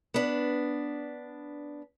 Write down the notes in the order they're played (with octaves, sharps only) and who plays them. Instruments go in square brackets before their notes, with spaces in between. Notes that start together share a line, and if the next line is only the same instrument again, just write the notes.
[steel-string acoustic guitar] B3 D4